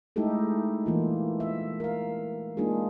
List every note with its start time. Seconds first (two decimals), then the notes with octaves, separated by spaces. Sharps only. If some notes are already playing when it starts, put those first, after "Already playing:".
0.16 G#3 A3 D#4 E4 G4 A4
0.86 E3 A#3 F4
1.40 E5
1.80 A#4 F5
2.57 G#3 A#3 D4 D#4 F4 G#4